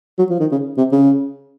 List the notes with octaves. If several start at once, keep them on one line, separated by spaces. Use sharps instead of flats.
F#3
F3
D#3
C#3
C3
C#3